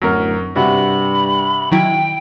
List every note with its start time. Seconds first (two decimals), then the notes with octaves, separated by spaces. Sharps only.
0.02 D1 F#2 A#4
0.56 G2 C3 F#4 B5
1.71 D#3 F#3 E4 G5